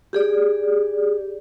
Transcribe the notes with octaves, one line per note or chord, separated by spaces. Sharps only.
G4 G#4 D5